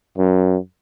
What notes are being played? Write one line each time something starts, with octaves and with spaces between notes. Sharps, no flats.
F#2